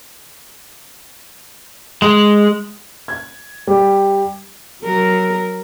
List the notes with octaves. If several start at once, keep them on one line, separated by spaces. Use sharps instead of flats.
G#3
G#6
G3
F#3 A#4